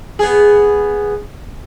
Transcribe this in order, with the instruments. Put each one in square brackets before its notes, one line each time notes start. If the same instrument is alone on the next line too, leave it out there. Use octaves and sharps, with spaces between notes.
[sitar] B3 G#4